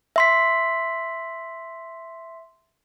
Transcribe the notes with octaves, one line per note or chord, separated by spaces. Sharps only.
E5 C6 B6